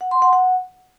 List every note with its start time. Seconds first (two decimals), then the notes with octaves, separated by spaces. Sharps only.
0.01 F#5
0.11 C6
0.22 F#5
0.33 F#5